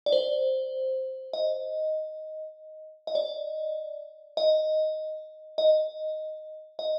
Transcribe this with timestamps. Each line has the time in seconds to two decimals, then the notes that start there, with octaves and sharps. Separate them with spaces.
0.06 D5
0.12 C5
1.33 D#5
3.07 D#5
3.15 D5
4.37 D#5
5.58 D#5
6.79 D#5